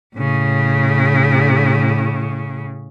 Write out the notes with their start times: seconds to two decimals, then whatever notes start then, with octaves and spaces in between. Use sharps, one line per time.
0.16 A2 C#3